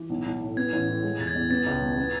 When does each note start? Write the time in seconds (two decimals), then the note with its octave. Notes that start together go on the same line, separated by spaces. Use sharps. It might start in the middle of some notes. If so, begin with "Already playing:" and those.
Already playing: E3
0.10 B1
0.26 B1
0.41 A2
0.57 B3 G#6
0.73 A1
0.88 A2
1.04 G#3
1.19 E1 A6
1.27 G#6
1.35 E2
1.50 B3 A6
1.66 C#2
1.82 B2
1.97 B3